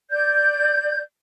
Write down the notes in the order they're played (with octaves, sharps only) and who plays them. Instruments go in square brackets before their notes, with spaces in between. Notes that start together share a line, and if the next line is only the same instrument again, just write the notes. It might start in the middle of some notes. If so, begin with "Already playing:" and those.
[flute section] D5 G6